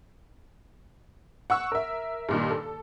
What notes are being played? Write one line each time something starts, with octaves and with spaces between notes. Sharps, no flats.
F#5 C#6 E6
A#4 E5
G2 A#2 D#3
A4